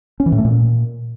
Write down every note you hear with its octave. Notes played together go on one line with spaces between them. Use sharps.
C#4
E3
A2
A3
A#2